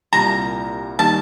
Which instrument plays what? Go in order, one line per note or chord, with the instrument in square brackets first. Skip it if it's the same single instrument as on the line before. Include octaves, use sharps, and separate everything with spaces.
[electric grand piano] C2 A#2 G3 [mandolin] A#5
[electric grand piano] D#3 G3 A#3 D#4 [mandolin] A5